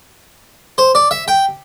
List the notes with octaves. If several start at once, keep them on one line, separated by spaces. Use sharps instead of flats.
C5
D5
E5
G5